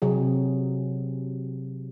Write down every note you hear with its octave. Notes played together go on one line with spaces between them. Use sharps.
C3 F#3 G#4